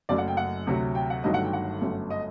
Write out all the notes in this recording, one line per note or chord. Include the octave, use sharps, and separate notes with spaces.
F#1 F#2 F#3 A3 D5
F#5
G5
F#5
D2 C3 F#3
G5
F#5
G1 G2 D#3 F#3 A3 D#5
F#5
G5
F#5
G1 F#2 F#3 A3
D#5